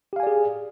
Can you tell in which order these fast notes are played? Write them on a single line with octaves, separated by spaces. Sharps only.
G4 F5 G#5 D5 G#4